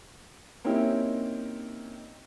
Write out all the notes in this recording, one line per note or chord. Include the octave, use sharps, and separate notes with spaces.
A#3 C4 C#4 D#4 E4 G4